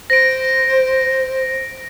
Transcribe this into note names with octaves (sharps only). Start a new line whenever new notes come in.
C5 A#6 D7